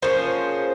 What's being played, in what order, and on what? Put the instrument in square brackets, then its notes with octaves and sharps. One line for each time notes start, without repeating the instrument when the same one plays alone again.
[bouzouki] F3 A#3 C#4 G#4 [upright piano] C5